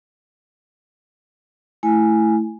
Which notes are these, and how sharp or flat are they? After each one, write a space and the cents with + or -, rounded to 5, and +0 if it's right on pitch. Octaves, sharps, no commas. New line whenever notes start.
A3 +0 E4 +0 G#5 +0